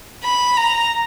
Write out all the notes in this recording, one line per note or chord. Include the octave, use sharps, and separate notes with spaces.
B5
A#5